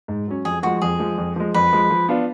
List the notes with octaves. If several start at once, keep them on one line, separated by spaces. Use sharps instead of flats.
G#2
F#3 C#4
F2 G#4
F3 G#3 F#4
F2 G#4
F3 G#3
F2
F3 G#3
F2 B4
F3 G#3
F3
B3 D4 F4